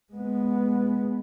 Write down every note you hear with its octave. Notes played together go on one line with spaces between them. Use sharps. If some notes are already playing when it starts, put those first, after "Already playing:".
G#3 B3